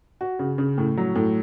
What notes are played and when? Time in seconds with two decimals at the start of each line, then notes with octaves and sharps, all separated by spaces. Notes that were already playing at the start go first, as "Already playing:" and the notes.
0.21 F#4
0.39 C#3
0.58 C#3
0.78 A2
0.97 F#3
1.15 A2